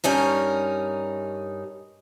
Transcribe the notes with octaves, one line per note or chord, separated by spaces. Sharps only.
G2 C#4 D#4 A#4